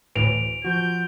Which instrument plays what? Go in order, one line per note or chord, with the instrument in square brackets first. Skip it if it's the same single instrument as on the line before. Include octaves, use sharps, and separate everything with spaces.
[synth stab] D2 A2 E3 [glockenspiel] D7 F7
[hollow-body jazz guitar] F3 F#4 [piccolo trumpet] G6